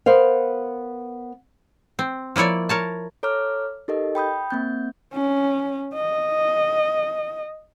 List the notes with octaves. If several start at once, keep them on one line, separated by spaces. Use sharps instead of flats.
B3 A#4 C5 F5
C4
F3 A#3 E4 C#5 D5
A#4 C#5 A5
A4 C#5 A#5 D6 F6
D#4 G4 A4 A#4 D#5
G5 B5 D#6 G6
A#3 C4 G6
C#4
D#5